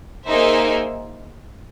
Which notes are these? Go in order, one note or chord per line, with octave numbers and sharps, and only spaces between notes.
A#3 D#4 G#4 C5 E5